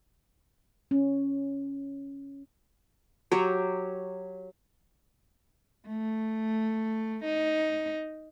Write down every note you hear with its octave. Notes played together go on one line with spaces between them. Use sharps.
C#4
F#3 G4 C#5
A3
D#4